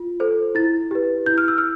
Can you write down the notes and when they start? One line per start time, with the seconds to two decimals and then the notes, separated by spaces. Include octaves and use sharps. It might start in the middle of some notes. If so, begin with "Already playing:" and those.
Already playing: F4
0.20 A4 C5
0.55 E4 A6
0.91 G4 B4
1.26 E4 G6
1.38 F6
1.48 E6
1.58 F6